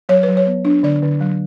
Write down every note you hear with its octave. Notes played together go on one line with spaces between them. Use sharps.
F#3 C#5
B4
F#3
C#5
B3
D4
D3 D5
D3
F#3